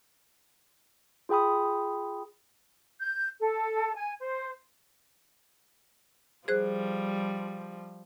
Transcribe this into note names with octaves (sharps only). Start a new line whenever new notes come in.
F4 G#4 G5 B5 D#6
G6
A4
G#5
C5
F3 G3 G#4 C5 F#6